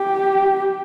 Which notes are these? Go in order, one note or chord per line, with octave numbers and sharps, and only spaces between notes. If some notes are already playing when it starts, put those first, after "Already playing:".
Already playing: G4